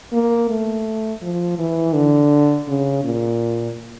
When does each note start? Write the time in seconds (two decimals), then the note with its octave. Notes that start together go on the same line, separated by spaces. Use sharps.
0.13 A#3
0.50 A3
1.22 F3
1.59 E3
1.95 D3
2.68 C#3
3.04 A#2